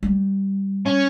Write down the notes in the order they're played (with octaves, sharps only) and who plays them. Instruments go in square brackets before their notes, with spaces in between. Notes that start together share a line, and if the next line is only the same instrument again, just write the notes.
[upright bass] G3
[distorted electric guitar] C#4